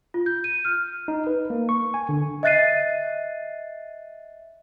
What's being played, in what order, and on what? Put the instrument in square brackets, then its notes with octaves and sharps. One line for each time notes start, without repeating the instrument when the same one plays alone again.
[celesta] F4
G6
D#7
F6
[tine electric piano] D#4
B4
A#3
C#6
G#5
D3
[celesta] D#5 E5 F#6 A6 C7 D#7